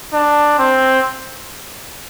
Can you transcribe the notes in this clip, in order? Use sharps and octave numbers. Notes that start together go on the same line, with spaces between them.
D4
C4